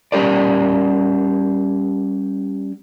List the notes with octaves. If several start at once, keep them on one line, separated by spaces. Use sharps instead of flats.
G3 C#4 G4 A#4 D5